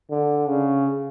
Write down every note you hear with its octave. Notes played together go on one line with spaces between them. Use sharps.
D3
C#3